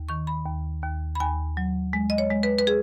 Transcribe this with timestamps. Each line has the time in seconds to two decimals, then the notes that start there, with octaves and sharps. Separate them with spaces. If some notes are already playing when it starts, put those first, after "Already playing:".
Already playing: D#2
0.09 D#3 C#6
0.27 B5
0.46 D#2
0.82 D#2
1.15 B5
1.20 D#2 G#5
1.57 F#3
1.93 G#3
2.10 D#5
2.18 C#5
2.31 G#3
2.43 B4
2.59 B4
2.67 G#4